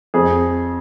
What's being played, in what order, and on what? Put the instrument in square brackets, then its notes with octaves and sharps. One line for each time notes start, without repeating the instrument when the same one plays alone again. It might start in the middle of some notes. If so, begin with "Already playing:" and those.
[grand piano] F2 G#4